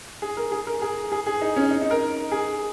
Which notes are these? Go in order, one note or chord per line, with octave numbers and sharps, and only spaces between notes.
G#4
A#4
G#4
A#4
G#4
G#4
G#4
D#4
C#4
D#4
D#4
A#4
G#4